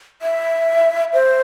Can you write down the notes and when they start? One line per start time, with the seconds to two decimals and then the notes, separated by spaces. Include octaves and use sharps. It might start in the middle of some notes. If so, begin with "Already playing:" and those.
0.22 E5
1.13 C5